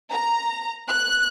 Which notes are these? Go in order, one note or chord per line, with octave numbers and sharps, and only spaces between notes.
A#5
F#6